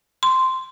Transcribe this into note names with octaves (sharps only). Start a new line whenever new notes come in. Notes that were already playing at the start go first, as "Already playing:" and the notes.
C6